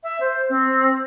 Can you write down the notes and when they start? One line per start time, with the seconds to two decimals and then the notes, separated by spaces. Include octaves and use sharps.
0.03 E5
0.20 C5
0.50 C4